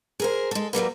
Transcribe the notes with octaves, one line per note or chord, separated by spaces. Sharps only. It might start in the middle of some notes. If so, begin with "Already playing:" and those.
G#4 A#4 C5
G#3 A4
F#3 G3 A#3 B4